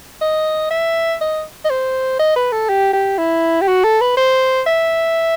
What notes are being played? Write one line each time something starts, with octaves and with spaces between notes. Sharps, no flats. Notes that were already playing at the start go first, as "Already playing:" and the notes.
D#5
E5
D#5
D#5
C5
D#5
B4
A4
G4
G4
E4
G4
F#4
A4
B4
C5
E5